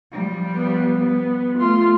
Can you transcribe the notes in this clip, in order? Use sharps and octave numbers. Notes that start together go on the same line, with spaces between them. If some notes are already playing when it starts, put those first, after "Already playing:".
F3 G3
B3
B3
A3 F4 C6